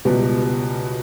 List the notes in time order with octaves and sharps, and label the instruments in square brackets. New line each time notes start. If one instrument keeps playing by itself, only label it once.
[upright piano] C#2 B2 G3 B3 G4